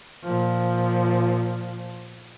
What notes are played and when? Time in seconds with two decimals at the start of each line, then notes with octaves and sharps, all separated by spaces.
0.24 A#2 F3